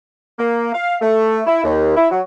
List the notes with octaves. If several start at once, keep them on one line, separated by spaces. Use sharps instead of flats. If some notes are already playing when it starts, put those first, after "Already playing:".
A#3
F5
A3
E4
D#2
E4
F#3